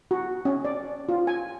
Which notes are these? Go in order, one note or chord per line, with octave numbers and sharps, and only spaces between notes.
F#4
C#4
D5
F4
G#5